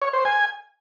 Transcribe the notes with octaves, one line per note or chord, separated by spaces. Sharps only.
C#5
C5
G#5